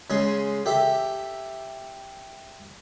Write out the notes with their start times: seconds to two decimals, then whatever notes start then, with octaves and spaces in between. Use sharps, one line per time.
0.10 C#3 G#3 G#4 C6
0.66 G4 A4 E5